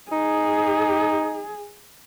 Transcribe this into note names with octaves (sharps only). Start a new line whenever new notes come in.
D#4 G#4